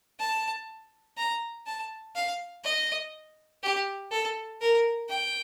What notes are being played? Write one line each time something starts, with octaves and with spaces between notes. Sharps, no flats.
A5
A#5
A5
F5
D#5
G4
A4
A#4
G5